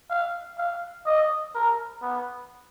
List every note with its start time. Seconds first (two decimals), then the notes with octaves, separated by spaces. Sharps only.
0.10 F5
0.58 F5
1.06 D#5
1.55 A#4
2.02 B3